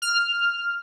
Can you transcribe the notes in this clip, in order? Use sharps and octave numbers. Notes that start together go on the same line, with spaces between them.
F6